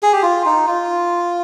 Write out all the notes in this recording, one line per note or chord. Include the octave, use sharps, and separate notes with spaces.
G#4
G4
F4
D#4
F4